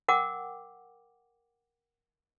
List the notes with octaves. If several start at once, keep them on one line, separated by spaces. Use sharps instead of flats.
A#4 F#5 G5 D6